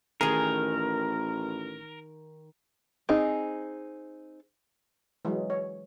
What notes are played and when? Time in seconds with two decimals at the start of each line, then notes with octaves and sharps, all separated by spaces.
0.21 A1 D#3 G#4 A#4
3.09 C4 D#4 G#4
5.25 E3 F#3 G#3
5.50 C#5